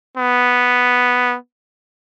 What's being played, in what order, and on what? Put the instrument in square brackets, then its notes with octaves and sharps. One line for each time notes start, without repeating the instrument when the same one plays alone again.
[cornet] B3